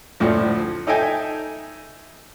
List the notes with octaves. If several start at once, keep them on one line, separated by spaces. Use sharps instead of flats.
D2 A2 F3
D#4 A4 D#5 E5 G5 G#5